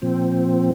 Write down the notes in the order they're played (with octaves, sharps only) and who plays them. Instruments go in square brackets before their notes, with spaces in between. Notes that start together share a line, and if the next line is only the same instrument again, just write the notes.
[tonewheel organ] A#2 F3 C4